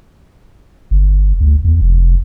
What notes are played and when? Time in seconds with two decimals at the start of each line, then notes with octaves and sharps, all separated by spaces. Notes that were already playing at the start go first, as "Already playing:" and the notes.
0.91 G1
1.41 D2
1.64 E2
1.81 F1